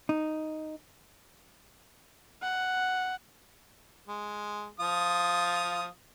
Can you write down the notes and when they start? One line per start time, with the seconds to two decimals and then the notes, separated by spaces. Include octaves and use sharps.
0.09 D#4
2.42 F#5
4.07 G#3
4.80 F3 F4 D#6